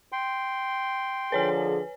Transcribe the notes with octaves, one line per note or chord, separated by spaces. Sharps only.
G5 C6
D3 F3 G#4 B4 C#5 G#5